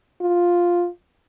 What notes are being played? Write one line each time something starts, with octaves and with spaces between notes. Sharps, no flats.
F4